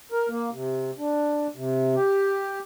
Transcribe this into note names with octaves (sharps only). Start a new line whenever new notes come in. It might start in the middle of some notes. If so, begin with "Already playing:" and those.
A#4
A#3
C3
D4
C3
G4